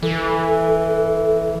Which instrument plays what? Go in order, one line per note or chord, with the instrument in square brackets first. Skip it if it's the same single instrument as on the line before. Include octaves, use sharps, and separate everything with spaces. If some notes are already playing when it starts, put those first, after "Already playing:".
[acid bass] E3 [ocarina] A4